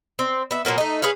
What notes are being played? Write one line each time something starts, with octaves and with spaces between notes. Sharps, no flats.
C4
B3 E5
A#2 F#3 A#3 B3
A3 D#4
G#4 B4 C#5 F5